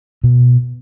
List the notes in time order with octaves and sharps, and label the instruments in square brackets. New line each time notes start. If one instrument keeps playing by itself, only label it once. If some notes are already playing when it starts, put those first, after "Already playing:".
[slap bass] B2